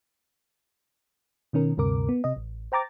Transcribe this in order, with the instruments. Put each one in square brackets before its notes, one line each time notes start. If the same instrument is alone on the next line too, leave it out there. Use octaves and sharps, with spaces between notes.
[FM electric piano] B2 D#3 C#4 A#4
D2 G2 C3 A#4 D6
B3
C3 D#5
A1
C5 G5 A#5 D6 A6